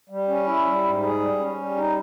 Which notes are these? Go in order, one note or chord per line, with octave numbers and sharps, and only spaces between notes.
G3
C#4
E4
G3
G#2
G#4
G3
C#4
G3
D#4